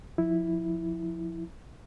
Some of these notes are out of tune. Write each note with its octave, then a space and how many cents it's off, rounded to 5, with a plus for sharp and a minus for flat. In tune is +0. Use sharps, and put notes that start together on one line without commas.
F3 +15 E4 -5